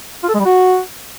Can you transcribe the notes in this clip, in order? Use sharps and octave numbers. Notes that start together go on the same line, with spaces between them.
F4
A4
G#3
G3
F#4